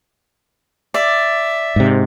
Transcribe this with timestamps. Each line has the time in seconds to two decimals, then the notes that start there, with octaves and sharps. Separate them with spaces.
0.94 D5 E5
1.76 G#2 C3